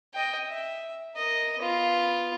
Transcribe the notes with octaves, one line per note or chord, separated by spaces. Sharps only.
D#5 G5
E5
A#4 D#5
B3 F4